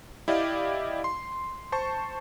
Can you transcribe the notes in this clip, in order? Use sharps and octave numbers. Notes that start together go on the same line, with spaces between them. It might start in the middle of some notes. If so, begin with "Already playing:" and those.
E4 G4 D5 D#5 F5
C6
C5 A5 C#6